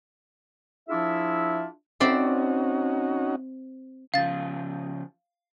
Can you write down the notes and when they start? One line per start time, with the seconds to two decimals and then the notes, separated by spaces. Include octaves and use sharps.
0.89 F3 D4 E4 F4 G#4 E5
2.00 C4 C#4 D#4 F#4 D5 E5
4.14 C#3 F3 F5 A6